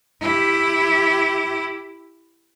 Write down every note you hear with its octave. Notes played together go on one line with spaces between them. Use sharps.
E4 G4